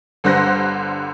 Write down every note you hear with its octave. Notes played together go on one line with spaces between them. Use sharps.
G1 D3 G3 C5 F#6 A#6